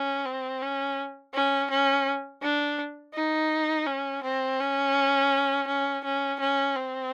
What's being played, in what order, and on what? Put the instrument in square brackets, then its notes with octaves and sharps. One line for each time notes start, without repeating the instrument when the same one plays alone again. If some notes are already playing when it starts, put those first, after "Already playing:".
Already playing: [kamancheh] C#4
C4
C#4
C#4
C#4
D4
D#4
C#4
C4
C#4
C#4
C#4
C#4
C4